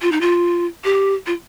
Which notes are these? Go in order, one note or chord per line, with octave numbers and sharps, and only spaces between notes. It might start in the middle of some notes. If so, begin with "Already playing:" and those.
F4
D#4
F4
G4
F4